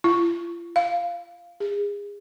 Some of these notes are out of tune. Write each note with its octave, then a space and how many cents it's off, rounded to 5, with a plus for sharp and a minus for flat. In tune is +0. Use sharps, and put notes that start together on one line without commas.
F4 -40
F5 +0
G#4 -30